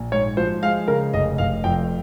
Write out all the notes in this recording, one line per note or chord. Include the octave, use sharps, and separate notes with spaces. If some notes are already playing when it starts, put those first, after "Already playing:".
Already playing: A#1
G#2 C#5
F3 C5
G#3 F5
C#3 A#4
F1 D#5
F1 F5
F2 G5